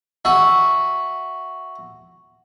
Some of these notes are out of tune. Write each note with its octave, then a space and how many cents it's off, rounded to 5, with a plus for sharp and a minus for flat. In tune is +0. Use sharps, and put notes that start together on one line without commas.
F#4 +0 E5 +0 G#5 +20